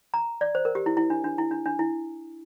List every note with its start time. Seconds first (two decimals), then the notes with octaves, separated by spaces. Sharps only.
0.14 A#5
0.41 D5
0.55 C5
0.65 A#4
0.75 G4
0.86 E4
0.97 E4
1.10 D4
1.24 D4
1.38 E4
1.51 D4
1.66 D4
1.79 E4